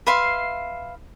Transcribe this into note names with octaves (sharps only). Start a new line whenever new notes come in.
B4 E5 F5 C6